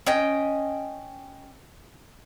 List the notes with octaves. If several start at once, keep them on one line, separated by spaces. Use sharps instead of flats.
C#4 D#5 G5